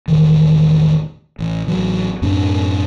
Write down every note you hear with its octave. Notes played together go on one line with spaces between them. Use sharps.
E1 A1 D#3
A1
A1 F#3
F#2 A2 C4 D4